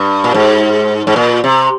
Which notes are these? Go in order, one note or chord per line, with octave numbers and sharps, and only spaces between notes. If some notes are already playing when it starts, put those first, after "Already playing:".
Already playing: G2
A#2
G#2
G#2
A#2
C3